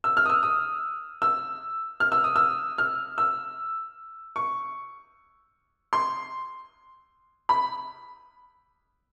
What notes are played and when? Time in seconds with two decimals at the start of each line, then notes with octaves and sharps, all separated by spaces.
0.04 E6
0.17 F6
0.26 D#6
0.30 E6
0.43 D#6
1.22 E6
2.00 F6
2.12 E6
2.24 D#6
2.36 E6
2.78 F6
3.18 E6
4.36 C#6
5.93 C6
7.49 B5